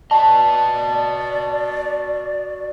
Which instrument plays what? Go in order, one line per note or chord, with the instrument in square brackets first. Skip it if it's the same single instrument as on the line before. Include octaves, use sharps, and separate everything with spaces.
[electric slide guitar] F#4 B4 D#5 [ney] D5 [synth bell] A5